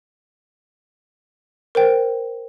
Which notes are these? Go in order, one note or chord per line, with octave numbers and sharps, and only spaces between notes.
A#4 C5 G5